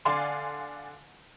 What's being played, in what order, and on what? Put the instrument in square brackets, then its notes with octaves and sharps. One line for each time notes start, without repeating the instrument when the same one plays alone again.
[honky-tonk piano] D3 D5 F5 G#5 C6